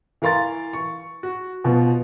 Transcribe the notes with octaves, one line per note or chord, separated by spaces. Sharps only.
E3 A#4 F5 C6 A6
C#6
F#4
B2 F3 B3